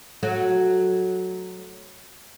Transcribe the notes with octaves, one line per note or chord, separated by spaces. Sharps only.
F#3 A3 F#4